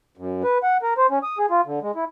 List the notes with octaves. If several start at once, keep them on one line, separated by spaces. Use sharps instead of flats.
F#2
B4
F#5
A#4
C5
C#4
D#6
G#4
F4
D3
G#3
E4